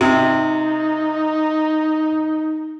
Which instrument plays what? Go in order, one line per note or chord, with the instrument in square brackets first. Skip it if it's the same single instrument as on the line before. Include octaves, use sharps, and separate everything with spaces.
[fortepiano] C3 [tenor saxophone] D#4